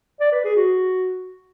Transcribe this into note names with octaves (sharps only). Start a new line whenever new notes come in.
D5
B4
G#4
F#4